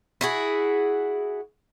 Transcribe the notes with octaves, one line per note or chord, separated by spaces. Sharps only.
E4 F#4 G#4